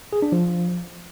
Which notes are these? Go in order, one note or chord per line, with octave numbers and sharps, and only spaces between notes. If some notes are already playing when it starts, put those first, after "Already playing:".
G#4
D4
F3